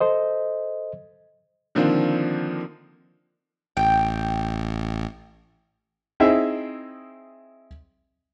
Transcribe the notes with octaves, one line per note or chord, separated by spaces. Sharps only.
A4 C5 D#5
D3 D#3 F3 A#3 C4 D4
A1 G5
C4 D#4 E4 G#4 E5